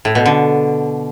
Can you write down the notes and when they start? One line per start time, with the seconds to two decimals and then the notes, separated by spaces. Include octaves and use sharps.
0.05 A2
0.15 B2
0.26 D3